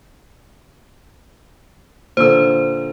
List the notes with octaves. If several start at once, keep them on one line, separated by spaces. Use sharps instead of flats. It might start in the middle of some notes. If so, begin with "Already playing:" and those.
A#2 D3 C5 E6